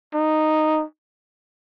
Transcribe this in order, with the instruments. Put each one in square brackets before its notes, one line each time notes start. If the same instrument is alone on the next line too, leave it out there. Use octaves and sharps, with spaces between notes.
[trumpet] D#4